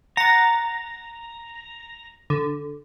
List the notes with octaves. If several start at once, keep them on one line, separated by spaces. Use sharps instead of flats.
F#5 A#5 A6
D3